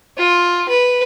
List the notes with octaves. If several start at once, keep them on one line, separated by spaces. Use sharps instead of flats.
F4
B4